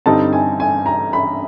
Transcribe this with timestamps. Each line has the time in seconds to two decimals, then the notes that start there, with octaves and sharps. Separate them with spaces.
0.06 G2 D3 G3 C4 D#4 A5
0.33 G#5
0.60 G#5
0.86 A#5
1.13 B5